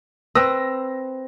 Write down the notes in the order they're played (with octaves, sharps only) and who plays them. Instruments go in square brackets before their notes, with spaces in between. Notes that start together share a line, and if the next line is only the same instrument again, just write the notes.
[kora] C4 B4 [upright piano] E6 A#6